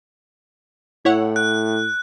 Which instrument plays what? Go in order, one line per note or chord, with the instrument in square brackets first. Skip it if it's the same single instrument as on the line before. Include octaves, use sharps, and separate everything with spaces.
[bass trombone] A2 [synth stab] E4 C#5 F#5
[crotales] F#6